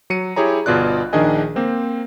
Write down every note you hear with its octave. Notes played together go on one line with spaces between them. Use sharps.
F#3 C#7 D#7
E4 G4 G#4 C#5 A#5
G1 B2 F4 D5 F#6
A#1 D#3 D4 G#4 D#5 G#5
A#3 C4 C5